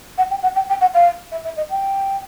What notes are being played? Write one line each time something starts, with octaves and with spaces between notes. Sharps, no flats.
F#5
G5
F#5
G5
G5
F#5
F5
E5
E5
D#5
G5